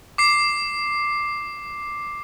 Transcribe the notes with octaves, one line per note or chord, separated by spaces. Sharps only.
D6 C7